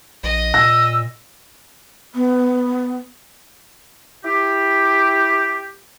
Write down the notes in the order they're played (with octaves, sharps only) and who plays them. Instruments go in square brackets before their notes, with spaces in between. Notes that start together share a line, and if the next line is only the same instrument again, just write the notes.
[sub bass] A#1 [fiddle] D#5
[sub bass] A#2 [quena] E6 [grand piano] A#6
[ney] B3
[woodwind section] E4 G4